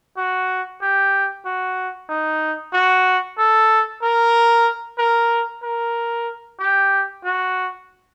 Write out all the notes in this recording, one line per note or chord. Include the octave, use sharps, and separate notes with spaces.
F#4
G4
F#4
D#4
F#4
A4
A#4
A#4
A#4
G4
F#4